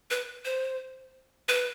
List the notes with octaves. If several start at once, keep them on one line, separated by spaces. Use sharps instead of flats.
B4
C5
B4